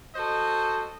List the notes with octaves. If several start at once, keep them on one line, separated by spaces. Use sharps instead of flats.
F#4 A4 C5 D#5